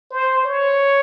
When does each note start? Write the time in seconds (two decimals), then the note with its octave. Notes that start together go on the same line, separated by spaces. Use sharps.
0.11 C5
0.44 C#5